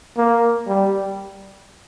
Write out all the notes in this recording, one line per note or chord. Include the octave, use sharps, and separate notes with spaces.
A#3
G3